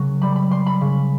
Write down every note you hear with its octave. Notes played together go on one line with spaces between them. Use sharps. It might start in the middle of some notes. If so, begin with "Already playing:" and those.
Already playing: C#3 F#3
G3 B5
B5
G3 C6
B5
C#3